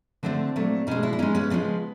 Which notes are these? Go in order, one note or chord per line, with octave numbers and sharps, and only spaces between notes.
D3 F3 A3 C4 D4
A#2 F#3 A3
B2 G#3 C#4 D#4
D4 E4
E4
B2 G#3 C#4 D#4
B3 C#4
C#3 F3 G#3 B3 C#4